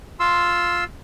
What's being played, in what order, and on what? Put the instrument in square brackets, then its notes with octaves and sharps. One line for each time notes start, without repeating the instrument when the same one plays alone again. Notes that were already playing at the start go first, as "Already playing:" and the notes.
[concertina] F4 C6 E6